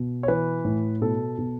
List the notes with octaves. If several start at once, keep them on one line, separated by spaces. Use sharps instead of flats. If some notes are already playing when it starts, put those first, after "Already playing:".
Already playing: B2
C#5
E3 B4
A2
B2 A4
B2